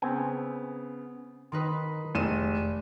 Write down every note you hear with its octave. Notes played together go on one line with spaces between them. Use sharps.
C#3 B3 C4 G5 G#5
D#3 D#4 B4 C6 D#6
F1 G#3 D#7 E7